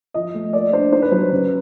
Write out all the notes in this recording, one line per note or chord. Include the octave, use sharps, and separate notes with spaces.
F3 D#5
A3
A#3 D5
D4 C5
D#4 C5
B4
F#3 C5
C#3 B4